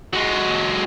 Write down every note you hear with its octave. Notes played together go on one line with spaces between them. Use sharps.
F#3 G#3